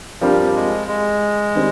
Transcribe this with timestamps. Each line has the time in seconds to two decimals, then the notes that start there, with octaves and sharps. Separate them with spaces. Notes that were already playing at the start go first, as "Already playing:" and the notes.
0.21 G2 F3 G3 C4 G4 A#4
0.55 G#3
0.88 G#3
1.55 D#3 G3 C4